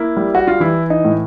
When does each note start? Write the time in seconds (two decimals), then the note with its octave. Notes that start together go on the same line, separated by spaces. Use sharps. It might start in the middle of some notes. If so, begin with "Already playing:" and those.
Already playing: A#3 E4
0.17 G3
0.35 F#4
0.48 F4
0.60 E3 E4
0.90 D#4
1.05 A2